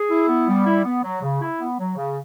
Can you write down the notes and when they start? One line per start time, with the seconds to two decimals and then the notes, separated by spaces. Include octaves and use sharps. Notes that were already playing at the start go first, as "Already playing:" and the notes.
Already playing: G#4
0.10 E4
0.28 B3
0.48 G3
0.66 E4
0.84 B3
1.03 F#3
1.22 C#3
1.41 E4
1.59 B3
1.78 F#3
1.96 C#3